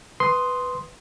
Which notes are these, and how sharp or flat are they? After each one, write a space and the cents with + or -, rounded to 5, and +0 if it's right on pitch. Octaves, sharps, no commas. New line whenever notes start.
B4 +5 C6 +0 D#6 +0